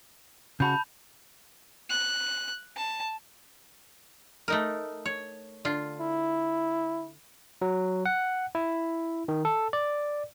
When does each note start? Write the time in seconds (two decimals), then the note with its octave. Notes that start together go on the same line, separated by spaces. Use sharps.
0.60 C#3 F#4 A5 B5 G6
1.90 F#6
2.76 A5
4.48 A3 D#4 A#4
5.05 C#5
5.65 D3 F4
6.01 E4
7.62 F#3
8.06 F#5
8.55 E4
9.28 D#3
9.45 A4
9.73 D5